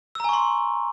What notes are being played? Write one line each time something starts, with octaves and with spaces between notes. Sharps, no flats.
G#5 A#5 C6 C#6 E6